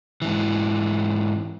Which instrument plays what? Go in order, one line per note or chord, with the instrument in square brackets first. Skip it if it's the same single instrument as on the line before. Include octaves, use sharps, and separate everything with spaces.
[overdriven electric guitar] G#2 E3